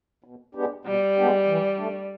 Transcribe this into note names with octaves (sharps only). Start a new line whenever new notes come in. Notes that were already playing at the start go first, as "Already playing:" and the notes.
B2
G#3 B3 D4 G4
B2 G3
G#3 B3 D4 G4
E3
A3 D4